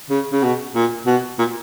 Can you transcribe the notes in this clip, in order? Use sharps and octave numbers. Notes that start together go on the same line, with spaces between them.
C#3
C#3
B2
A#2
B2
A#2